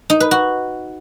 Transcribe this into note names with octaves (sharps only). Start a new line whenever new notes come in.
D#4
B4
F#4